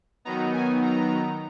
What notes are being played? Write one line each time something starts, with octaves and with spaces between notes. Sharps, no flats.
D#3 F#3 B3 D#4 A#5
G#5
A#5